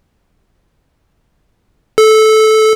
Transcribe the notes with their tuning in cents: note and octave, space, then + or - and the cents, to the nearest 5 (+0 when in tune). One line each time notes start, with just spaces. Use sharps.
A4 -15